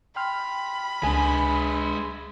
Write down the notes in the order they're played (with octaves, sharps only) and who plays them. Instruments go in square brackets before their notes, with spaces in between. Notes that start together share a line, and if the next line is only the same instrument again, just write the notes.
[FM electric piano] G5 C6 F6 [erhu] B5
[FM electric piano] C#2 [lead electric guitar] G#3 B4 [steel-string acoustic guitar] D4 G#5